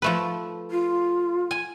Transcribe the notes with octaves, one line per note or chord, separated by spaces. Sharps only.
F3 A3 B4
F4
G#5